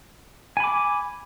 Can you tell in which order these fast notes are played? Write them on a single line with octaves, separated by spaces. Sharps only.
G#5 B5 D6